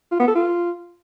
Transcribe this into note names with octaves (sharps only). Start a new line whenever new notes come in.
F4
B3
A4
F4